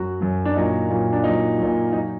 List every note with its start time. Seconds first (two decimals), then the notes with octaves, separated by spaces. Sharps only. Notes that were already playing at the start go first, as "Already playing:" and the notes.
Already playing: F#2 F#3 F#4
0.21 F#2 F#3
0.45 D4
0.55 A#2 F#3 D#4
0.90 A#2 F#3
1.13 D4
1.24 A#2 F#3 D#4
1.58 A#2 F#3
1.93 F#3 D#4